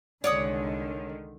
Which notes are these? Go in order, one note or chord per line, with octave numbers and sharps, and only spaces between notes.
C2 D3 D#3 G#3 C#5 D5 F#5 D#6